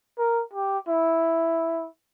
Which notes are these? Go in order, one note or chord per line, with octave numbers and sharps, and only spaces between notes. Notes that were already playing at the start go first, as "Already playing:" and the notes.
A#4
G4
E4